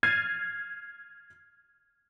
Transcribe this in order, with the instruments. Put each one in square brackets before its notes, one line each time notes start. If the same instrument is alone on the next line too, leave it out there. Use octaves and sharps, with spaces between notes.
[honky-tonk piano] F6 G#6 A6 C7 D#7